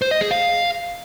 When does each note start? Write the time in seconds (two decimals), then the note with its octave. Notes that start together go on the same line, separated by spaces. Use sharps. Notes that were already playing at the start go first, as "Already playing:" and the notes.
0.02 C5
0.11 D#5
0.21 G#4
0.31 F5